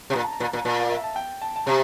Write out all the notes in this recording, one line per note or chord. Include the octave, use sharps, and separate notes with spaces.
C3
A#2 A#5
A5
A#5
A#2
A#2
A#2 A5
F5
E5
A5
G5
A5
A5
C3 A#5